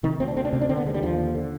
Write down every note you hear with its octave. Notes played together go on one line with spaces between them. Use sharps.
C3 D#3
D2 C4
D4
D2 C4
D4
C3 C4
D4
D3 C4
B3
D#2 G#3
G3
D#2 F3
D3
D3